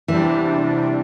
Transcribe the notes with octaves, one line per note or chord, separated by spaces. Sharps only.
E2 C3 E3 G3 D4